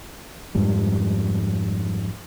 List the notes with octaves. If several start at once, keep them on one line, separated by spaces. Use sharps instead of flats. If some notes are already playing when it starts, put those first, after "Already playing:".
F2 G#2 F3 G3